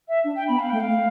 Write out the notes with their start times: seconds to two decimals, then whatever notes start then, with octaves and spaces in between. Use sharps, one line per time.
0.08 E5
0.24 D4
0.36 G5
0.48 B3 B5
0.59 F5
0.70 A3 G5
0.80 F5
0.88 A3